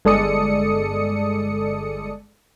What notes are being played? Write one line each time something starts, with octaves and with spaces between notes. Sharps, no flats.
G1 G#3 A4 D5 D#6 C#7